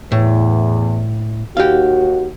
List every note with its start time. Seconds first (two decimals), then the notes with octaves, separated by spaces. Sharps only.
0.12 E2 A2
1.57 D#2 F#4 G4 F5